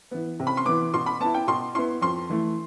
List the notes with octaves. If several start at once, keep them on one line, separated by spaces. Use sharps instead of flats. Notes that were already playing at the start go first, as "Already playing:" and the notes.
E3 B3
C3
B5
C6
E3 B3 D6
B2 C6
B5
B3 E4 A5
G5
B2 C6
B3 E4 C6
F2 C6
E3 A3